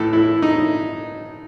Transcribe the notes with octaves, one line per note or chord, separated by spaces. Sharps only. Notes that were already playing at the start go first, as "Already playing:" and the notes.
Already playing: A2 E3 A4
E4
D#4